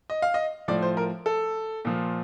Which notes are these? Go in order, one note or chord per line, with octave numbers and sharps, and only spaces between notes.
D#5
F5
D#5
A2 F3 D5
C5
A#4
A4
A#2 F3